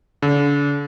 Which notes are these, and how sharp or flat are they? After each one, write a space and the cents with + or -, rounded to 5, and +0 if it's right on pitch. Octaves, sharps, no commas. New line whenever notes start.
D3 -40